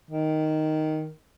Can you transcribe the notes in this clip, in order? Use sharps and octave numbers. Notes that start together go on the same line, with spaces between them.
D#3